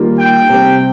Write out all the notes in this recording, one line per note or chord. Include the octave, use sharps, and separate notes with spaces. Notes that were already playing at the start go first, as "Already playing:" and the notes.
Already playing: D#3 G3 A#3 F4
G5
C3 G3 C4